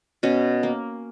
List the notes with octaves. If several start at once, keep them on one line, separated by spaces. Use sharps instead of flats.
B2 C#4
A#3